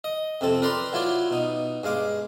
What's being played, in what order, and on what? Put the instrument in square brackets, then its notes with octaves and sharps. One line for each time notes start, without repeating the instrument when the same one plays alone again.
[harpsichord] D#5
F2 C3 C4 A4
A#4 B4 D5 A#5 C6
F#3 E4 F4 D5
B2 D#4
G2 G#3 F5 D6